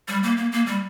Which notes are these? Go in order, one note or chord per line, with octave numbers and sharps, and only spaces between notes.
G3
A#3
A#3
A#3
G3